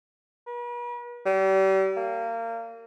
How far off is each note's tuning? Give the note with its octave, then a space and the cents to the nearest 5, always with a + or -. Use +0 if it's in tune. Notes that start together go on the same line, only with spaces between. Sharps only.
B4 -40
G3 -35
A#3 -25